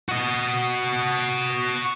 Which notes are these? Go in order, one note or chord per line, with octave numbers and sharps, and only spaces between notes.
F#4 D#5